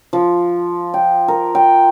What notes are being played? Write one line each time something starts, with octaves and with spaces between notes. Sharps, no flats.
F3
G5
A#4
G5